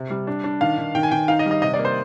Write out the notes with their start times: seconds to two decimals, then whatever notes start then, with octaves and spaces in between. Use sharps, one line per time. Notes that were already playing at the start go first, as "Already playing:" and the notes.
Already playing: C3
0.10 G3
0.27 D4
0.44 D4
0.61 D#3 F5
0.78 D#3
0.95 D#3 G5
1.03 G#5
1.11 D#3 G5
1.28 D#4 F5
1.39 D#5
1.46 G3
1.51 D#5
1.62 C3 D#5
1.74 D5
1.79 A#3
1.85 C5